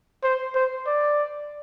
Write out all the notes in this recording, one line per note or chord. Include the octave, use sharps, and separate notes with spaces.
C5
C5
D5